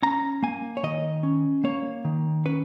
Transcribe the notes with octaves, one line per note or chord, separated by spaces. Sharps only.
C#4 A#5
A#3 G#5
C#5
D#3 D#5
C#4
A#3 C#5
D#3
C#4 B4